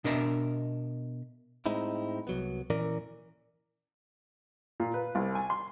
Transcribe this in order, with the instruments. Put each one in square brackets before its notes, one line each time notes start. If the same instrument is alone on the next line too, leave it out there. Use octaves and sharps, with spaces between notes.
[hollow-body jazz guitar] B2 D4 A#4 D#5 E5
[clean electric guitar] A2 G#3 C4 D#4 E4
C2 F#3 B3
A#2 E3 C#4 A#4 D5
[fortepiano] A#2
B4
C2
G#5
C6